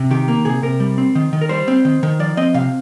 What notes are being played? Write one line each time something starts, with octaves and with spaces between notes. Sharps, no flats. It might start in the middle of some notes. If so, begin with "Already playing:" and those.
Already playing: C3
D#3 G4
A#3
C3 G#4
C3 A#4
G3
C4
D#3
D#3
A#4
G3 C5
C4
D#3
D#3
F3 D5
C4 D#5
C3 F5